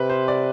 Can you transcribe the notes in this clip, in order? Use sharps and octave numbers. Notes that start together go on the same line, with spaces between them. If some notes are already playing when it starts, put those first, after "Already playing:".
Already playing: C3 B4
C5
D5